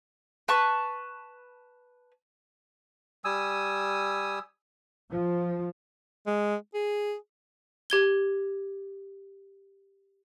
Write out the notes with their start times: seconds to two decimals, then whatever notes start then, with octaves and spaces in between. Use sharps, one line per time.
0.48 B4 A5 C#6
3.25 G3 G#5 D#6 E6
5.10 F3
6.26 G#3
6.74 G#4
7.90 G4 G#6 G7